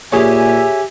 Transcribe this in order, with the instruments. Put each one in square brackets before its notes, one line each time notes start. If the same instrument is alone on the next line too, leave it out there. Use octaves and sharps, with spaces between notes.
[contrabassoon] A#2 [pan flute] G4 [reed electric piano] G#4 C#5 [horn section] E5 G#5